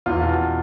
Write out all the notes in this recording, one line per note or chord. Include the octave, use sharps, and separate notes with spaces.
E2 F4
B2